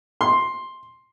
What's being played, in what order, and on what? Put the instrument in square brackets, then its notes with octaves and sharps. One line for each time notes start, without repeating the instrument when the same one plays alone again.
[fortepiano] C6